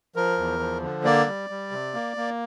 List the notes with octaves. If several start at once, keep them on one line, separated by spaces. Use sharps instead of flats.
F3 A#4
E2
F3
D3
A#3 D5
G3
G3
C3
A#3
A#3